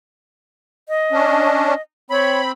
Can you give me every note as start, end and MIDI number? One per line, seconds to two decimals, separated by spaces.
0.89 1.81 75
1.12 1.74 61
1.12 1.74 62
2.11 2.52 60
2.11 2.42 73
2.11 2.52 83